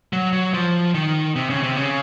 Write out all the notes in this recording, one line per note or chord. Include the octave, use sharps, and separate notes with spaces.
F#3
F#3
F3
D#3
C3
C#3
C3
C#3